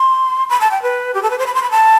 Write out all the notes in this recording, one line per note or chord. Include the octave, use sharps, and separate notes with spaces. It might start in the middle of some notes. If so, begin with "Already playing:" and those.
Already playing: C6
B5
A5
G5
B4
G4
A4
B4
C5
B5
C6
B5
A5